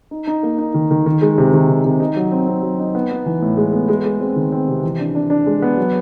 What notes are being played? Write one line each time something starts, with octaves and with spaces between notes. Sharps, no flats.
D#4
D#4
A#3
D#4
D#3
D#3
D#3
G#3
C3
D#3
D#3
C3
D#4
F#3
C4
C4
F#3
D#4
B3
B3
E3
A2
G#3
B3
G#3
G#3
C4
D#3
C4
C3
E3
D4
D4
D4
G#3
B3
F#3